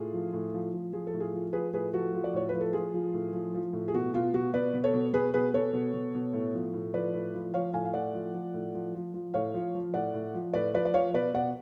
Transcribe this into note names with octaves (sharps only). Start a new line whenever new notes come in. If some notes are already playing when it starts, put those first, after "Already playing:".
Already playing: A2 F4 G#4
F3
A2
F3
F3
F3 G#4
A4
A2
F4 G#4
F3
F3 G#4 B4
A2 G#4 B4
F3 F#4 A4
F3
D5
A2 C#5
F3 B4
A4
F3 F4 G#4
F3
A2
F3
F3
A2
G#4
B2 F#4
B2 F4
B2 F#4
B2 B4 D5
B2
A4 C#5
B2
B2 G#4 B4
B2 G#4 B4
B2 A4 C#5
B2
B2
B2
A2
F3
A2
F3 B4 D5
A2
F3
F3 C#5 F5
A2 F5 G#5
F5
A2 D5 F#5
F3
F3
A2
F3
F3
F3
A2 C#5 F5
F3
F3
A2 D5 F#5
A2
F3
A2 B4 D5
F3 B4 D5
D5
F3 C#5 F5
B2 B4 D5
B2 D5 F#5